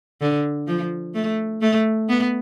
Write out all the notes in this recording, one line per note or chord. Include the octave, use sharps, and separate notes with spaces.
D3
F3
A3
A3
B3